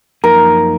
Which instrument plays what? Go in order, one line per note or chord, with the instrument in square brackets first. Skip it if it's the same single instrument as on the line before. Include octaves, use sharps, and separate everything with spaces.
[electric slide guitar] F#2 F3 A#3 D#4 [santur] A#4